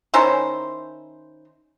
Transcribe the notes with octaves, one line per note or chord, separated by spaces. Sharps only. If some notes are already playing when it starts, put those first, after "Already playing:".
D#3 C#4 E4 C5